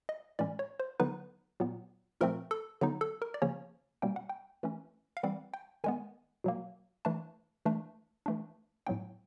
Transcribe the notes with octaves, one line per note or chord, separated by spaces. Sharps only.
D#5
A2 E3 G#3 C#4 D5
C#5
C5
D3 F#3 B3 D#4 B4
A#2 F#3 B3
A#2 F3 A3 C4 A#4
A4
D3 F#3 B3 D#4
A4
A#4
D5
C#3 F3 A#3 C#4 C#5
B2 G3 A#3 C#4 G5
F#5
G5
E3 A3 C#4
F5
E3 G3 C4 F#5
G5
D#3 G#3 B3 G#5
B2 F#3 A#3
E3 A3 D4 A5
E3 A3 D4
E3 A3 D4
A2 F#3 B3 D4 G5